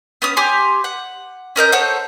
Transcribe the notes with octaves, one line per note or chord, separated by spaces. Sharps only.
B3 C#4 D#6
G4 C#5 G#5 C6
F#5
C#4 A#4 D#5 G6
A4 C5 C#5 F#5